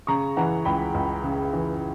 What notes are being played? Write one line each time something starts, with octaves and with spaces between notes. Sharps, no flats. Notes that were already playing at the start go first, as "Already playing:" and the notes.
C#3 A#5 C#6
E3 F#5 A#5
C#2 G5 B5
C#2
C#3
E3